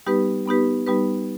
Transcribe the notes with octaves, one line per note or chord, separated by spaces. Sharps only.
G3 B3 D#4 G4 B4
G3 B3 D#4 G4 B4
G3 B3 D#4 G4 B4